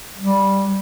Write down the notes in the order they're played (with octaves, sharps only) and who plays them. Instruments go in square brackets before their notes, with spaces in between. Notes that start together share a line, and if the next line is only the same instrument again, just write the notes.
[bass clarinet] G3